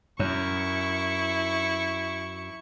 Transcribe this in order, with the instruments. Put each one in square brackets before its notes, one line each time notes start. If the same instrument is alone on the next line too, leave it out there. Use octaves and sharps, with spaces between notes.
[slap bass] F#2 [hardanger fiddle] E4 C#6